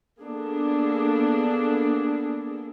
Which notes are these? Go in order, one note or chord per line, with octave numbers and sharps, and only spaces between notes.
A#3 B3 D4 G#4 A4